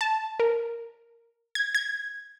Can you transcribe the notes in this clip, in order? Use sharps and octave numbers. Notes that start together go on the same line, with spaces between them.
A5
A#4
G#6
G#6